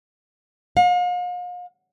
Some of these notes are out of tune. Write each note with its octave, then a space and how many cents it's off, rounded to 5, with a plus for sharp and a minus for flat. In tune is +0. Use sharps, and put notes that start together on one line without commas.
F5 +40